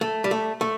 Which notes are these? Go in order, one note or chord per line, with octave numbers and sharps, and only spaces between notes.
A3
G3
A3
A3